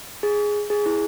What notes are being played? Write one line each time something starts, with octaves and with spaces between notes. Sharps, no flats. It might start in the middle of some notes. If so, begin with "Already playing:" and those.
G#4
G#4
E4